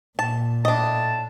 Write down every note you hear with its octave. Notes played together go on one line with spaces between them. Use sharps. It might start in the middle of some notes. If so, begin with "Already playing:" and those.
A#2 A5
A2 D4 D#5 A5